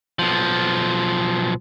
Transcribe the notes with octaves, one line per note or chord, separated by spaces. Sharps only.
B1 F3